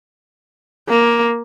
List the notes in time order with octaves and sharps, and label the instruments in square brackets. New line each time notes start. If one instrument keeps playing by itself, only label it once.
[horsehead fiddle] A#3